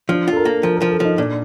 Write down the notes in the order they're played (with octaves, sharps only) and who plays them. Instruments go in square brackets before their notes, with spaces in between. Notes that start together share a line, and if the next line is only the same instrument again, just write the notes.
[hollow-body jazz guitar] F3 [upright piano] D4
[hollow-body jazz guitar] F4 [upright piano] A4
[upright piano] A#4
[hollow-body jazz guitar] A#3
[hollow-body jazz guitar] F3 [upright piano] A#4
[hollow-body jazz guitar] F3 [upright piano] A#4
[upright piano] A4
[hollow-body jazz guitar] F3 [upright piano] D#4
[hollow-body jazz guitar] A#2 [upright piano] D4